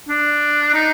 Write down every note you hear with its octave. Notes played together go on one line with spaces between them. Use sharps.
D4
D#4